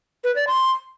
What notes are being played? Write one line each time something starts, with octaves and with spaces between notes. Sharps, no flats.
B4
D5
C6